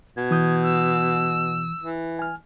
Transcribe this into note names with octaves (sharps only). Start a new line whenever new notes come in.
B2 G#6
E3 D#6 G6
E6
E3
G#5 F6